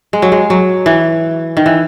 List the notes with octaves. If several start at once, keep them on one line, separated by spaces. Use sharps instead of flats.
G#3
F#3
G#3
F#3
E3
D#3
E3